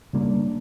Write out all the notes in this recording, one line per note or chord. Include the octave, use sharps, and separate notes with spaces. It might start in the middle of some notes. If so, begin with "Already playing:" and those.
C#3 G3 A#3 D4